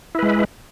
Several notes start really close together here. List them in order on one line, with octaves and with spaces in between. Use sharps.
E4 B4 G#3